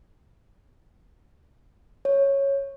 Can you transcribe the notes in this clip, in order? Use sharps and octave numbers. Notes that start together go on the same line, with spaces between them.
C#5